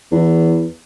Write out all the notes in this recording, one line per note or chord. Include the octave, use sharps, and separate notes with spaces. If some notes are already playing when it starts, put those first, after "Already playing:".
E2